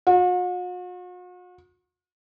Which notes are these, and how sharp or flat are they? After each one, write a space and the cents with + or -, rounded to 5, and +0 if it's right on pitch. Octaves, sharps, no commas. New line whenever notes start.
F#4 -45